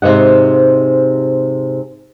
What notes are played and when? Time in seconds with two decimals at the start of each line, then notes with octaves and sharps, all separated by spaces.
0.02 G#2 C3 A#3 D#5 F#5